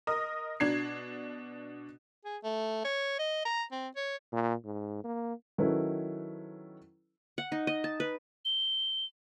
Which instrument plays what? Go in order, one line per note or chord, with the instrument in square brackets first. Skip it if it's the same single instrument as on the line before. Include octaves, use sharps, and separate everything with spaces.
[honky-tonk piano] A#4 D#5 D#6
B2 D4 G#6 C7
[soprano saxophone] G#4
A3
C#5
D#5
A#5
C4
C#5
[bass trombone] A#2
G#2
A#3
[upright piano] D#3 F#3 C#4 E4 A4 B4
[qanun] F#5
D#4
D#5
A5
B4
[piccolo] G7